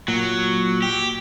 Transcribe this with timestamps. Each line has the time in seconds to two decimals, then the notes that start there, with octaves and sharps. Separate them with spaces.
0.08 A#2 F#3
0.82 G4